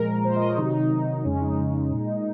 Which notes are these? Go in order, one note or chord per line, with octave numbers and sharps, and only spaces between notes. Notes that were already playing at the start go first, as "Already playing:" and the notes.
Already playing: A#2 F3 G#3 A#4
A#2 F3 G#3 C5
D#5
C#5
C3 D#3 F#3 D#4
C3 D#3 F#3
F2 C#3 G#3 C#4
D#4
F2 C#3 G#3
A#2 G#3